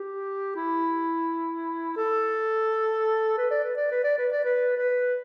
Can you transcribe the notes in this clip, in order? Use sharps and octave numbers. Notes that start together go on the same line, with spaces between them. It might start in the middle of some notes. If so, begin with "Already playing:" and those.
Already playing: G4
E4
A4
B4
D5
B4
D5
B4
D5
B4
D5
B4
B4